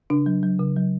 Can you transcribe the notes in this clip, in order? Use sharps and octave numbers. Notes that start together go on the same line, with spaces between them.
C#3 D4
F#3
F#3
C#3
F#3